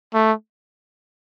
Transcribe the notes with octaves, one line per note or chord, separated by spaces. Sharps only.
A3